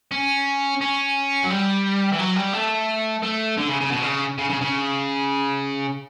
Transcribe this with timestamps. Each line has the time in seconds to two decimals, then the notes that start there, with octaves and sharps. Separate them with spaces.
0.12 C#4
0.81 C#4
1.44 F#3
1.50 G3
2.13 E3
2.19 F#3
2.36 G3
2.54 A3
3.23 A3
3.58 D3
3.69 C#3
3.81 C#3
3.91 B2
4.02 C#3
4.38 C#3
4.50 C#3
4.61 C#3